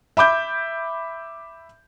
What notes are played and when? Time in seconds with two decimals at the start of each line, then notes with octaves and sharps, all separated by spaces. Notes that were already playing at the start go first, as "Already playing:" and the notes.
0.17 E5 B5 D6 G6